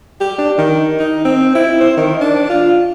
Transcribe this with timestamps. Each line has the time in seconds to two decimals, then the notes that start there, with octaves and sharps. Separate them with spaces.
0.21 G4
0.38 D4
0.58 D#3
0.99 D#4
1.25 C4
1.55 E4
1.80 C5
1.97 D#3
2.21 D4
2.50 F4